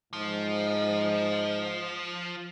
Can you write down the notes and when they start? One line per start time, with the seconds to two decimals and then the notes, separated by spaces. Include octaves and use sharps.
0.13 G#2 F3